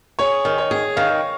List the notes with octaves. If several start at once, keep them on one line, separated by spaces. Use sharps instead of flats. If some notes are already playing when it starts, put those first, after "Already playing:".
G#4 C#5
D#3
C#5
G#4
D#3 F5